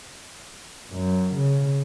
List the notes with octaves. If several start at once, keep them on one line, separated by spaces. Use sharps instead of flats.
F#2
C#3